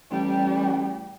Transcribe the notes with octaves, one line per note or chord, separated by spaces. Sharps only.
A1 G3 G4